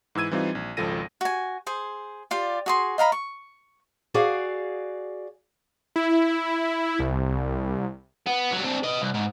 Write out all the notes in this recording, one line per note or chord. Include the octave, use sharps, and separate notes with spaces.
G#2 E3 E4 E6 G#6 D#7
E3 G3 C4 D#4 F4
A#1
G#1 C#2 F3 A4 A#6 D#7
F#4 G#5
G#4 C5
F4 G4 D5
F#4 G#4 C6
D#5 F5 A#5 B5
C#6
F#4 G#4 D5 F5
E4
C2
B3
F#3 G3
C4 D4
B4 D#5
C2
G#2